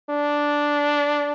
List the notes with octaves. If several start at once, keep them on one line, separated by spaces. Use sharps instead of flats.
D4